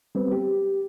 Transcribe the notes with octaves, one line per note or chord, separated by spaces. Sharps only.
G3 B3 C4 B4
G4